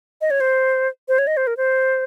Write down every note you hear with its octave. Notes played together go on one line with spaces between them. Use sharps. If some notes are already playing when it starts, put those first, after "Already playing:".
D#5
C#5
C5
C5
C#5
D#5
C5
A#4
C5